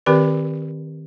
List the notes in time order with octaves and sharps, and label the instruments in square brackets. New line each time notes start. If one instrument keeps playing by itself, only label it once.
[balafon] D#3 C4 G4 A#4 B4 D5